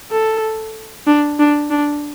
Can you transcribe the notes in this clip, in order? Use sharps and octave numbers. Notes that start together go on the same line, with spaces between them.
A4
D4
D4
D4